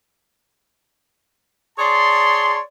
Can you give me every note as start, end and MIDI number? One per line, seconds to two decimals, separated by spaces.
1.79 2.60 68
1.79 2.60 73
1.79 2.60 74
1.79 2.60 81
1.79 2.60 84